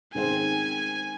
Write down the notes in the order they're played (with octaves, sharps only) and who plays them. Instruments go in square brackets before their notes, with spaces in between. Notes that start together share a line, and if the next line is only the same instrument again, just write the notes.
[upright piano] G#2 D#3 C4 G#4 C5 [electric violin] G#5